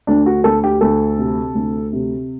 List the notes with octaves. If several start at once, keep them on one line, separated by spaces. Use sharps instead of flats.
D2 D4
F#4
D2 A4
G4
D2 A4
C3
D2
C3